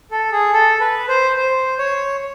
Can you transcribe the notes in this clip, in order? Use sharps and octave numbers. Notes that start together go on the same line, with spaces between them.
A4
G#4
A4
B4
C5
C5
C#5